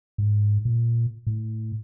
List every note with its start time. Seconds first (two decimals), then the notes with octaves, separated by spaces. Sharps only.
0.18 G#2
0.65 A#2
1.27 A2